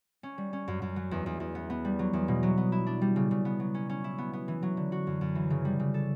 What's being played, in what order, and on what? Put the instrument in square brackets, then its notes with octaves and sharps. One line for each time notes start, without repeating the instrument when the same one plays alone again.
[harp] C#4
G3
C#4
F#2
F#2
F#3
E2
E2
E2
B3
B3
G3
F#3
E2
B2
F#3
B3
E4
D4
G3
C#3
C#3
B3
F#3
C#4
C#4
E4
B3
B3
E3
F#3
D3
F#4
F#2
F#2
E3
C#3
G3
C#3
A4